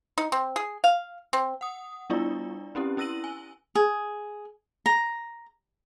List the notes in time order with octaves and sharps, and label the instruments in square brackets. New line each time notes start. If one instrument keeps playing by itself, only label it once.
[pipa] D#4
C4
G#4
F5
C4
[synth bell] F#5 D#6
G3 B3 D4 E4 F4 D5
C4 C#4 E4 G4
C#4 E4 E6 A#6 D#7 F#7
G#5
[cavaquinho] G#4
A#5